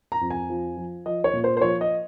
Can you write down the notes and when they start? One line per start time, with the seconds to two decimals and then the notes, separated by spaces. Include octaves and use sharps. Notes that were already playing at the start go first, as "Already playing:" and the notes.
0.12 A#5
0.21 F2
0.30 G#5
0.50 F3
0.77 F3
1.06 F3 D#5
1.24 C#5
1.33 A#2
1.44 C5
1.57 C5
1.62 F3 C#5
1.81 D#5